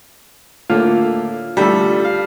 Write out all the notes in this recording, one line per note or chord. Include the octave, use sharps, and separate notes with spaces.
A2 D3 A#3 F4
A1 D3 G3 A4
F5